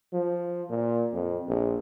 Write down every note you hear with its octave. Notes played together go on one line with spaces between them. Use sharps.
F3
A#2
F2
A#1